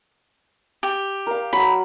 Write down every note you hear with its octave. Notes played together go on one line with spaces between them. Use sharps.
G4
A#4 F5
F#3 B5 E6